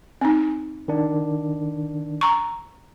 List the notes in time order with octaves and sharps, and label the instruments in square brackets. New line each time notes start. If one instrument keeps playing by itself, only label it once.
[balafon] C4 D#4
[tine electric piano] D#3 D4
[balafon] A#5 C#6